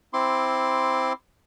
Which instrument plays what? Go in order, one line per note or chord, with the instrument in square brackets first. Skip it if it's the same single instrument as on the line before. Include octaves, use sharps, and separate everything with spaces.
[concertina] C4 E4 C6 D6